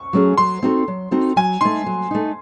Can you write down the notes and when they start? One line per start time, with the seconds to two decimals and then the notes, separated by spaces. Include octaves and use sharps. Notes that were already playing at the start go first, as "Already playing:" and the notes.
Already playing: C#6
0.13 F#3 A3 C#4 G#4
0.37 F#3 C6
0.63 C4 D#4 F#4 A4
0.88 F#3
1.11 C4 D#4 F#4 A4
1.36 F#3 G#5
1.61 A3 D#4 C6
1.86 F#3
2.11 A3 D#4